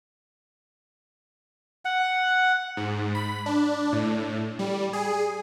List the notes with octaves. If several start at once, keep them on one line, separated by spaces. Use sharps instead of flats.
F#5
G#2
B5
D4
A2
G3
G#4